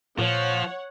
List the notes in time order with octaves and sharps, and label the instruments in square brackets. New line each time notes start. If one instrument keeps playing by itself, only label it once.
[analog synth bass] A#2 [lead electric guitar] F3 [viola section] C#5 F#5